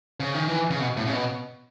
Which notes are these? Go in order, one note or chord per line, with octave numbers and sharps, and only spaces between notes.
C#3
D#3
E3
C#3
B2
A2
C#3
B2